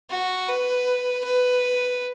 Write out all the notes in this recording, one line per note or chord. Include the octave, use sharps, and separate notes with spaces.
F#4
B4
B4